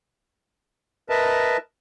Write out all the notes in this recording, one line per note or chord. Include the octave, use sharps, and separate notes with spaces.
A#4 B4 D#5 E5 A5